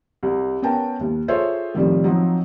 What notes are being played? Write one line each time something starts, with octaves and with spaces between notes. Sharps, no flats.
C2
B3 C#4 A#4 G5 A5
D#2
F4 G#4 A4 C5 C#5 E5
A2 C3 D#3 F3 G3
F3 F#3 C4 D#4